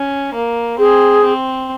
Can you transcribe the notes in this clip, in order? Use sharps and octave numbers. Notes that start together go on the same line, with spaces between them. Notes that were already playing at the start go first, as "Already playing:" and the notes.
Already playing: C#4
A#3
C4 G#4
C4